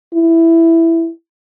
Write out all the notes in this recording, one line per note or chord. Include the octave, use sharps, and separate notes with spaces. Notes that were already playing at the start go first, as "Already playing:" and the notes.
E4